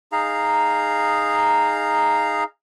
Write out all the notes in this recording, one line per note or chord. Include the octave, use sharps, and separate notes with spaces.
D#4 G#4 F5 A#5